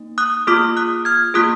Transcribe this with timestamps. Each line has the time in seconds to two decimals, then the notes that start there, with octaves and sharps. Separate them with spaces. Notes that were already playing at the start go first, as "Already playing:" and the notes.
Already playing: A#3 D#4
0.18 D#6 F#6
0.47 A#3 F4 G#4 D6 F6
0.77 D#6 F#6
1.05 F6 G#6
1.34 A#3 F4 G#4 D#6 F#6